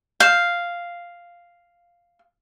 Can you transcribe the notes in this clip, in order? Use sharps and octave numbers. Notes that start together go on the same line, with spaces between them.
F5 G6 E7